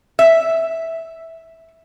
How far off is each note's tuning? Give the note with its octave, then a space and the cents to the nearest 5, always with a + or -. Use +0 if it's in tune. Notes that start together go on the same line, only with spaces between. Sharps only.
E5 -10